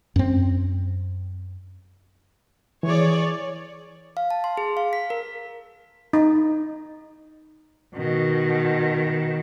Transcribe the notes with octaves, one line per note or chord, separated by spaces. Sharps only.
F#2 C4
E3 G#4 C#5 D5
F5
A5
C6
G#4
F5
B6
A#4
D#4
B2 D#3